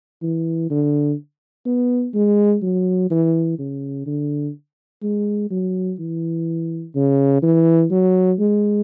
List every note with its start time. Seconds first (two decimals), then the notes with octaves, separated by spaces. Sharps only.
0.22 E3
0.70 D3
1.66 B3
2.14 G#3
2.63 F#3
3.11 E3
3.59 C#3
4.06 D3
5.03 G#3
5.51 F#3
5.99 E3
6.95 C#3
7.42 E3
7.91 F#3
8.39 G#3